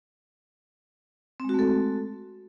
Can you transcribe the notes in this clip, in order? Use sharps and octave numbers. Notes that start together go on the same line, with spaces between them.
G#3 A3 C4 F#4 A4